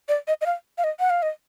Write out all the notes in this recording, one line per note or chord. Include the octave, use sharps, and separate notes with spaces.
D5
D#5
D#5
F5
F5
D#5
F#5
F5
D#5